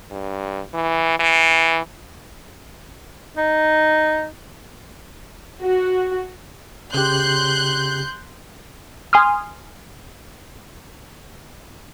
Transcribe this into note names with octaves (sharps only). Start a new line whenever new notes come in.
G2
E3
E3
D#4
F#4
C#3 G4 C6 F#6 G6
G#5 C6 D#6 F6